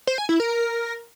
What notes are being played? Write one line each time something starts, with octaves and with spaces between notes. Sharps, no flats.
C5
G#5
E4
A#4